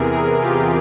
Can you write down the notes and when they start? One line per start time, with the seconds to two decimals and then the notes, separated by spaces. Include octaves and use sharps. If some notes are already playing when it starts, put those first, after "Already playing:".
Already playing: E2 C3 E3 G#4 A#4
0.12 G#4 A#4
0.41 F4 G4